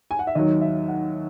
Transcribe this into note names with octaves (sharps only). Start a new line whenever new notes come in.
G#5
F#5
E5
D#2 D#3 F#3 D#5
E5
F#5